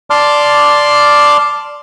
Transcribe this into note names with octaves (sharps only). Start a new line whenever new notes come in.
D5 A5 C6 D6 F6